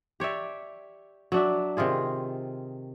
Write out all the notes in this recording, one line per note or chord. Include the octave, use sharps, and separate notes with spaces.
G4 C#5 D5 E5
F#3 D4 E5
C3 D#3 F4 G#4